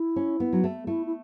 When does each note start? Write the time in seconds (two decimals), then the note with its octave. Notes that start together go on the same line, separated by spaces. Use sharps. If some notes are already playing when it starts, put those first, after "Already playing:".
Already playing: E4
0.16 C#4
0.40 B3
0.53 F#3
0.64 A3
0.87 A3 E4
1.06 E4